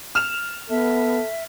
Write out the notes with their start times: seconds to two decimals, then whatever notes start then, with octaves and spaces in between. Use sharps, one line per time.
0.15 F6 E7 F7
0.70 B3 A4 E5